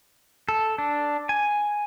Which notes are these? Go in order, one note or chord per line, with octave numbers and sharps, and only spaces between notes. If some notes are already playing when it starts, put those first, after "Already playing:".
A4
D4
G#5